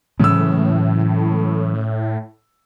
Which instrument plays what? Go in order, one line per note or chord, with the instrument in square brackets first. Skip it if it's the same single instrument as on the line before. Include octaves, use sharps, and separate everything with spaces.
[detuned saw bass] A2 [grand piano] C#3 E6 [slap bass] E3 F#3 G#3